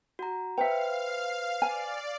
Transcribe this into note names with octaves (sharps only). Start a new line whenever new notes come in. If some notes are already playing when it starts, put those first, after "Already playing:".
F#4 A#5
B4 C5 E5 F5 G5
D5 G#5